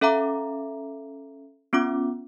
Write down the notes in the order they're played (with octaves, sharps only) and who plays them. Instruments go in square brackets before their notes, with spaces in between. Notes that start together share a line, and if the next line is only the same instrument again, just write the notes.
[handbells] C#4 A4 E5 F5 A#5 D6
B3 C#4 F4 D6